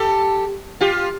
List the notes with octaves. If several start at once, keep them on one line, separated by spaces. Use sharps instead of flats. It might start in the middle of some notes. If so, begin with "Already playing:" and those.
Already playing: G4 A4
F4 G4